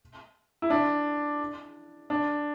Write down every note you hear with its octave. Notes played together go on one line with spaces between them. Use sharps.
E4
D4
D4